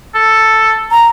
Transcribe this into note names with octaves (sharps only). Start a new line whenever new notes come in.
A4
A#5